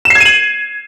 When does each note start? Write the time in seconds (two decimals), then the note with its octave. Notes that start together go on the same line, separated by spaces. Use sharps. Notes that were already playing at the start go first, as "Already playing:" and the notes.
0.05 E7
0.10 C7
0.15 G#6
0.20 D#7
0.25 F#7